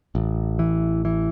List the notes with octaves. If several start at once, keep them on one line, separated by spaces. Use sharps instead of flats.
A1
E3
E3